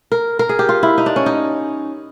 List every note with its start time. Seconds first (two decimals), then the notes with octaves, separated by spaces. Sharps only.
0.12 A#4
0.39 A#4
0.49 G#4
0.59 G4
0.69 F4
0.83 E4
0.98 D#4
1.06 D4
1.16 C#4
1.26 D#4